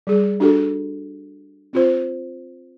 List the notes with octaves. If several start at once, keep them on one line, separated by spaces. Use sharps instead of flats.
G3 G#4
D4 F#4 G4 A4
C4 F4 C5